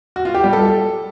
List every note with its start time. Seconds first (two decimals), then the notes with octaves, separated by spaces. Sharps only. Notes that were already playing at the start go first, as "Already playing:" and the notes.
0.16 F#4
0.25 F4
0.34 G4
0.44 G3
0.53 A4